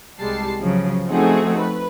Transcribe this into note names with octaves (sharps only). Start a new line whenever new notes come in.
C2 G3 G#3 A5 C7
C#3 F3 F#3
F3 A3 C4 D#4 F#4 G#4
B4